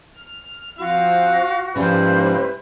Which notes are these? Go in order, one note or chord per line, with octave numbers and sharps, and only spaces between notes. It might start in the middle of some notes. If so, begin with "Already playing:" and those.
F6
F3 C4 F4 F#4 F5
G#2 C#3 F3 G3 A#3 E4 B4 C5